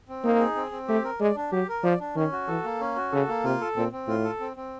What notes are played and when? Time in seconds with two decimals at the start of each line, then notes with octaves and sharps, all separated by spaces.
0.09 C4
0.24 A#3 D#4
0.39 G#4
0.56 C4
0.71 C4
0.88 A3 G4
1.04 A#4
1.20 G#3 D5
1.35 D4
1.52 F#3 G4
1.69 A#4
1.84 F3 D5
2.00 D4
2.16 D#3 C#4
2.32 F#4
2.48 E3 A4
2.64 A#3
2.80 C#4
2.96 F#4
3.12 C#3 A4
3.29 A#3
3.44 C3 F4
3.61 A4
3.76 A#2 C4
3.92 C4
4.08 A2 F4
4.24 A4
4.40 C4
4.57 C4